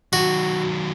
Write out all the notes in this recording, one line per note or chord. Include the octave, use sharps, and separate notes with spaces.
D#3 F#3 F#4